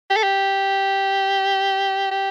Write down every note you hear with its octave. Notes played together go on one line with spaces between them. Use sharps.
G4
A4
G4
G4